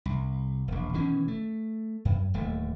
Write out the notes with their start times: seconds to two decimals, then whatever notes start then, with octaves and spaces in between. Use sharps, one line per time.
0.06 C2
0.68 E1 A#1
0.94 B2 D#3 E3 C#4
1.28 A3
2.05 F#2
2.34 D1 D#2 A3